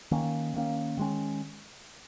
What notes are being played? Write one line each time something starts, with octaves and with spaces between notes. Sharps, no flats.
D#3 A#3 C#4
D#3 A#3 C#4
D#3 G#3 C#4